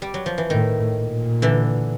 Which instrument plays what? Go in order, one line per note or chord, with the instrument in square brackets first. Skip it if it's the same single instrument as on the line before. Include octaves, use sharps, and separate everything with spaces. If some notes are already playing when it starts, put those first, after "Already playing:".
[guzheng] G3
F#3
F3
E3
[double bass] A2 [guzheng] D#3
[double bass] A#2
[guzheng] D3 E3